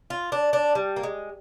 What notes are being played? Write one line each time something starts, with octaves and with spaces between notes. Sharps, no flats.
F4
D4
D4
G3
A#3
G#3